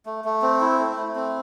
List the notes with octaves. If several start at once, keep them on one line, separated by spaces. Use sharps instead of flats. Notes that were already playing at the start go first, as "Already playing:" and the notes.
A3
A3
C4
E4
A3
A3
C4